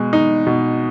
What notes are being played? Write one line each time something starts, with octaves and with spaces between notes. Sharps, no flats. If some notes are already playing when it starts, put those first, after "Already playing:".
Already playing: B2 G#3
D#4
B2